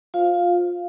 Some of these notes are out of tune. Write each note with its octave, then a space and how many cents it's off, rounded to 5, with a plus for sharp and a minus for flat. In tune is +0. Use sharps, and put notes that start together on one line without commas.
F4 +20 C5 +0 F5 +0